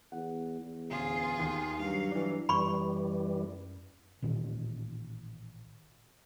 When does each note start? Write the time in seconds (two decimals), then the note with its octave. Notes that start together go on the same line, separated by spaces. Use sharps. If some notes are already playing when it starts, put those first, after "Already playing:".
0.12 E2 F#5
0.60 E2
0.90 A1 D2 F4 G#4
1.40 D#2
1.79 G2 F#3 F5
2.11 E3 D4
2.49 F#2 E3 G3 B5 C#6
4.22 A1 A#2 D#3